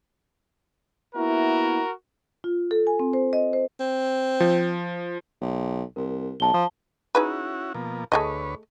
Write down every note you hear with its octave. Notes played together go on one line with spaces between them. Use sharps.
A#3 B3 E4 F#4 A#4
F4
A4
G#5
C4
C5
D#5
C5
C4
F3
B1
C2 A#4
B1 A5 G7
F3
C#4 D#4 E4 F#4 G#4 B4
B2 F3 A#3
D2 A3 G#4 B4 C#5 D#5